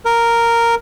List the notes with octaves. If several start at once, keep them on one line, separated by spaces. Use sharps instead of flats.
A#4